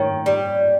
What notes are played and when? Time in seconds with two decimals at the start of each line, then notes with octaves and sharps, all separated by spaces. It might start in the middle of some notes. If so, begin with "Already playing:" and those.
Already playing: D#3 C#5
0.26 G3